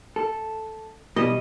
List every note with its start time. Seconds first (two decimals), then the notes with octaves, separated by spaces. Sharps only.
0.16 A4
1.16 B2 E3 G3 D#5